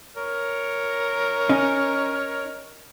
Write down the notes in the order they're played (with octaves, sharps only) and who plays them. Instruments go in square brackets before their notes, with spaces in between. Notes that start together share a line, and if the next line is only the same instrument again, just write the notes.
[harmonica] A#4 C#5 F6
[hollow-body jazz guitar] C#4 D#4